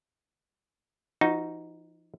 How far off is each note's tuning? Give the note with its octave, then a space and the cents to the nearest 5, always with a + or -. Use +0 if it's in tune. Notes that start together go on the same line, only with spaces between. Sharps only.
F3 -40 D#4 +0 F#4 +0